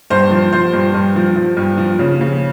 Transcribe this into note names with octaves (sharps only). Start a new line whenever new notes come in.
G2 C5
F3
F3 C5
G2
G2
F3
F3
G2
F3
C#3
C#3